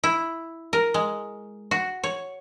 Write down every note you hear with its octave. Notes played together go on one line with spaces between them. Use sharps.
E4
A#4
G#3
F#4
C#5